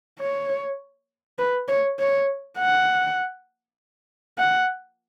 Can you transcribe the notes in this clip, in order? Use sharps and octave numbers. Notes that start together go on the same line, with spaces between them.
C#5
B4
C#5
C#5
F#5
F#5